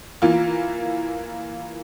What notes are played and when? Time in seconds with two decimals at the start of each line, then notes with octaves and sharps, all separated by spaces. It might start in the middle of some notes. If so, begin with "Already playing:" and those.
0.22 E3 A#3 F4